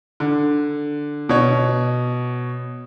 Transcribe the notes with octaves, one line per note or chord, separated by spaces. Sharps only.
D3
B2 C#5